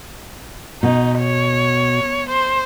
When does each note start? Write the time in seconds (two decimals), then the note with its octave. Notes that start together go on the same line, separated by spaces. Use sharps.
0.83 B2 D#4
1.20 C#5
2.29 C5